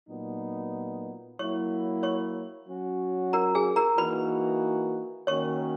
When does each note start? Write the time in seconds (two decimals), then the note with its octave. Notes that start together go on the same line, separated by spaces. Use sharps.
0.09 A#2 F#3 B3 D#4
1.39 F#3 A#3 E4 C#5 C#6
2.03 C#5 C#6
2.68 F#3 C#4 F#4
3.33 A#4 A#5
3.55 G#4 G#5
3.76 A#4 A#5
3.98 E3 A#3 D#4 F#4 B4 B5
5.27 D#3 A#3 C#4 F#4 C#5 C#6